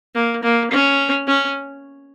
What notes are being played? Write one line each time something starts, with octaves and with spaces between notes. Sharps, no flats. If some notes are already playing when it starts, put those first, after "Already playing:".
A#3
A#3
C#4
C#4